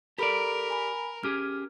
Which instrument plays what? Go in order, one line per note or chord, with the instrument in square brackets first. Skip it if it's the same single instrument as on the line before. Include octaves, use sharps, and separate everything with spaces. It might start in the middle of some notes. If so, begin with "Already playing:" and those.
[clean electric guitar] G4 D5 [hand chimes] A4 B5 [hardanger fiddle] A#4
[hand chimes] G#5 A#5 B5
[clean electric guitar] C#4 G4 G#4 [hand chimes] F6